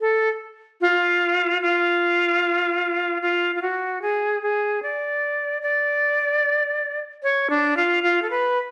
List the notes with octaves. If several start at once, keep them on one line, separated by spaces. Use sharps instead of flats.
A4
F4
F4
F4
F4
F#4
G#4
G#4
D5
D5
C#5
D4
F4
F4
A4
B4